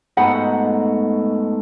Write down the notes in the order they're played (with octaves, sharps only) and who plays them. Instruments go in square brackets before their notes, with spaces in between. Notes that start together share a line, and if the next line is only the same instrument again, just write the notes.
[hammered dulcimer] G#2 B2 A3 [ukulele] D#4 F#5 B5